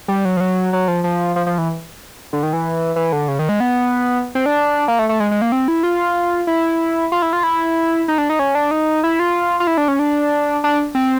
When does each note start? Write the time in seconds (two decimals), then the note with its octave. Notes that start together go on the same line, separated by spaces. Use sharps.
0.08 G3
0.25 F#3
0.37 F3
0.40 F#3
0.73 F#3
0.88 F3
1.04 F3
1.36 F3
1.47 F3
1.58 E3
2.33 D3
2.43 D#3
2.53 E3
2.96 E3
3.13 D3
3.28 C#3
3.39 D#3
3.49 G#3
3.60 B3
4.35 C4
4.46 D4
4.88 A#3
4.99 A3
5.09 A3
5.20 G#3
5.31 G#3
5.42 A#3
5.52 C4
5.68 E4
5.83 F4
6.47 E4
7.12 F4
7.22 E4
7.33 F4
7.43 E4
8.08 D#4
8.18 D4
8.30 D#4
8.39 C#4
8.55 D4
8.71 D#4
9.04 E4
9.19 F4
9.60 F4
9.67 E4
9.78 D4
9.88 C#4
9.99 D4
10.64 D4
10.95 C4